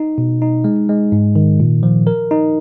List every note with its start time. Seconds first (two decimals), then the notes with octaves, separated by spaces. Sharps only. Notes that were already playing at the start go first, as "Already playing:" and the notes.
Already playing: D#4
0.18 B2
0.42 D#4
0.64 G#3
0.89 G#3
1.12 G#2
1.36 D#3
1.60 A#2
1.83 F3
2.07 A#4
2.31 D#4